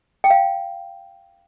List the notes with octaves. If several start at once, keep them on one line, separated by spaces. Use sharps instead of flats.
G5
F5